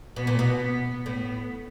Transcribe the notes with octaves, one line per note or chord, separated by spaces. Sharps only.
B2 B3
A#2
B2
B3
A2 B3